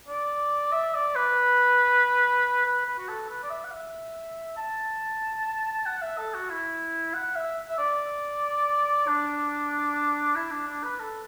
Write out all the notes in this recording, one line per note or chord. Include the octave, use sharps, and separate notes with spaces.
D5
E5
D5
B4
B4
B4
F#4
A4
B4
D5
E5
F#5
E5
A5
F#5
E5
A4
F#4
E4
F#5
E5
E5
D5
D4
E4
D4
D4
B4
A4